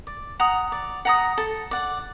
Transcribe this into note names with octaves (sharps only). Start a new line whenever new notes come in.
D5
F#5 A#5 D#6
D5
F#5 A#5 D#6
A4
D5 F#5